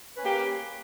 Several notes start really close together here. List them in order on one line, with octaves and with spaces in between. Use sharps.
B4 C#4 A#3 G4